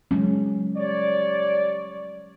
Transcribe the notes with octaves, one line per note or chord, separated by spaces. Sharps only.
F#3 G#3 C#4
G3 C#5 D5